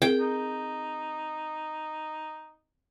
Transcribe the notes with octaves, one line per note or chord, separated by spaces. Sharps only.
C4 G#4 A#4 G5
D#4